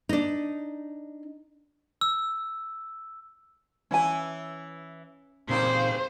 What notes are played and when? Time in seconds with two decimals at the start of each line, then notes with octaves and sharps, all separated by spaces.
0.09 D4 D#4
2.01 E6
3.91 E3 C#4 E4 G#5
5.49 A#2 C#3 G3 A#3 C4 D#4 C5